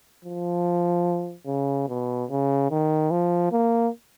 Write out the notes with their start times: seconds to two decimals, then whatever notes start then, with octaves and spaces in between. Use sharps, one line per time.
0.25 F3
1.47 C#3
1.88 B2
2.30 C#3
2.71 D#3
3.11 F3
3.52 A#3